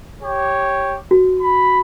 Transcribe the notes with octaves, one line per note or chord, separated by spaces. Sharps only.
G4 C#5
F#4
B5